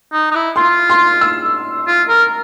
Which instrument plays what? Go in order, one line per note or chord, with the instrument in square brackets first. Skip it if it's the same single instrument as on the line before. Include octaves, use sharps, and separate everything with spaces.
[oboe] D#4
D#4
E4
[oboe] F4 [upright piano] C6
[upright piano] C6
E6
[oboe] F4
A#4